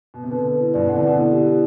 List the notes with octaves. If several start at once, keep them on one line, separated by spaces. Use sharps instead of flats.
B2
C3
B2 D3 B4
B4
E4
G2 B2 D5
B2 D3 F#5
C3 E3
B2 D3 D5
E4
G4
E4